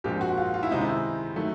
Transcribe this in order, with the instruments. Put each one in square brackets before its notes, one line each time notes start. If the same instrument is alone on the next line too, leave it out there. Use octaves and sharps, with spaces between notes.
[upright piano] A#1 A#2 F3 G#3 C4 G4
F#4
F4
F4
E4
C#2 C3 D#3 G#3 C4 D#4
E4
D#3 F#3 A3